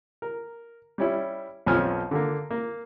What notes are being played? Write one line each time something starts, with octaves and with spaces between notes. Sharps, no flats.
A#4
G3 C#4 E4
B1 F2 F3 C#4 G#5 F6
D3 A#3
A#3